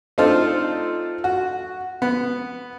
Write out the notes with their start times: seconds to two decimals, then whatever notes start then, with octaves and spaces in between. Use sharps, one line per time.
0.18 A3 C4 D4 D#4 F4 A4
1.24 F#4
2.02 B3